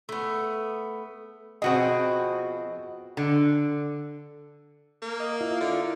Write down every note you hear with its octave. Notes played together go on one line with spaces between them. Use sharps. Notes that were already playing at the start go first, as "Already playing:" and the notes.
A3 B3
B2 D3 F3 C4 F#4 G#4 D#5
D3
A#3
D#5
E4 F4
D3